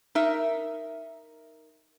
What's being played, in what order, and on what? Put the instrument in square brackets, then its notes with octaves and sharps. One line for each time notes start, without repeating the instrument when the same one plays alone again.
[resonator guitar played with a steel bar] D#4 A#4 E5